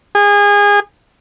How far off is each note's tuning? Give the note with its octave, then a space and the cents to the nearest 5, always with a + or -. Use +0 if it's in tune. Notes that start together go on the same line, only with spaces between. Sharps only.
G#4 -25